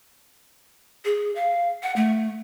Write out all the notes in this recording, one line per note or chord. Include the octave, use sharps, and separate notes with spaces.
G#4
F5
F#5
A3